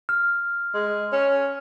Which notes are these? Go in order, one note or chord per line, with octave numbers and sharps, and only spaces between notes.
F6
G#3
C#4